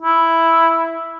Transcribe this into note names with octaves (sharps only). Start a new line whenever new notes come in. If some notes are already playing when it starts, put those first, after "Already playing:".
E4